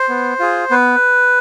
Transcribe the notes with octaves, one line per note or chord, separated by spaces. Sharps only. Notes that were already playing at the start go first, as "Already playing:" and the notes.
Already playing: C5
B3
F4 G#4
B3 B4